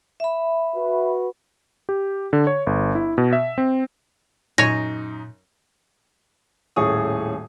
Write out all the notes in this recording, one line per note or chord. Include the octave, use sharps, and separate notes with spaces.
E5 B5
F#4 B4
G4
D3
C#5
G1
E4
B2
E5
C4
F#2 A#2 D#4 C#5 G#5 A#6
D#1 A2 C#4 G#4 C#6 D#6